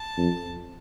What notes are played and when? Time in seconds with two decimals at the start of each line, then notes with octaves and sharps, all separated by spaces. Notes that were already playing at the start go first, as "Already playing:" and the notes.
Already playing: A5
0.18 F2